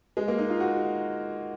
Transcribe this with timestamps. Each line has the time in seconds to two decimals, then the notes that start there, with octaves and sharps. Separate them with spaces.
0.17 G#3
0.28 A#3
0.38 D#4
0.50 F4
0.60 F#4